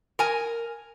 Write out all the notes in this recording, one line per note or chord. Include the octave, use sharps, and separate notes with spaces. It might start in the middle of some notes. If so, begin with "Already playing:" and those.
A#4 G#5